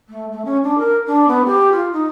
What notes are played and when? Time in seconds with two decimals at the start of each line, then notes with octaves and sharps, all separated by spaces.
0.09 A3
0.32 A3
0.45 C#4
0.64 D4
0.78 A#4
1.07 D4
1.28 B3
1.46 G4
1.72 F4
1.93 D#4